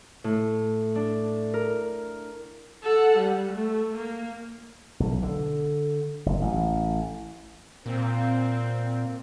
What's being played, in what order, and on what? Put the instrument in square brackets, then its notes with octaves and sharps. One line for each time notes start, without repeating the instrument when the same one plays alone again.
[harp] A2
D4
A#4
[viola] A4 F#5
G3
A3
A#3
[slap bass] B1
D3
F#1
A1
[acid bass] A#2 [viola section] C4